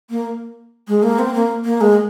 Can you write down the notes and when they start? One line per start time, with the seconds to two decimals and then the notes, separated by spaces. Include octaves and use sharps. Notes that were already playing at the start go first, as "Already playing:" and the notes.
0.10 A#3
0.88 G#3
1.03 A#3
1.19 C4
1.34 A#3
1.65 A#3
1.81 G#3